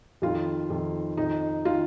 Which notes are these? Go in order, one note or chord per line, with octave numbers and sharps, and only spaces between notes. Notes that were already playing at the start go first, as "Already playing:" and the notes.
F2 D#3 F4
F2 D#3
F2 D#3 D#4
D#3 F4